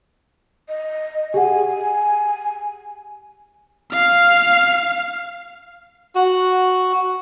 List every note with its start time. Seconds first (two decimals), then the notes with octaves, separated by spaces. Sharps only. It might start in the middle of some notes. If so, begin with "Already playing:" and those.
0.69 D#5
1.34 G4 G#4 F#5 G#5
3.92 F5 F6
6.15 F#4